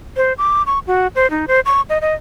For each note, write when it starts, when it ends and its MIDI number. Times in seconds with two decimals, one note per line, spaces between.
0.16 0.33 72
0.38 0.62 86
0.66 0.79 85
0.87 1.07 66
1.15 1.29 72
1.30 1.45 63
1.48 1.60 72
1.65 1.81 85
1.89 1.98 75
2.01 2.14 75